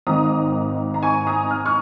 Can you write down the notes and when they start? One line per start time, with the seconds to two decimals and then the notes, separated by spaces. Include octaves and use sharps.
0.07 G#1 G#2 D#3 A#5 D#6
0.94 A#5
1.03 G#5 C#6
1.27 A#5 D#6
1.50 F6
1.66 C#6 F6